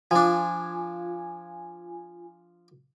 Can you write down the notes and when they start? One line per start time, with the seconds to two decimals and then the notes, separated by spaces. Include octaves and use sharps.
0.11 F3 D4 F4 G#5